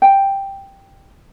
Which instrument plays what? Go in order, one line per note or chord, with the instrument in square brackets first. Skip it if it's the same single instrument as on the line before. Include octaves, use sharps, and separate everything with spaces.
[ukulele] G5